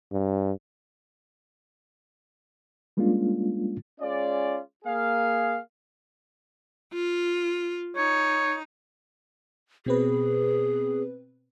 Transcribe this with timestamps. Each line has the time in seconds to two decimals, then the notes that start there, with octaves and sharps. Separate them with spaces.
0.12 G2
2.97 G3 G#3 A#3 C#4 D4 F4
4.00 G#3 C#4 F4 D5
4.85 A#3 G#4 F5
6.93 F4
7.96 D#4 C#5
9.86 B2 C4 G#4 B4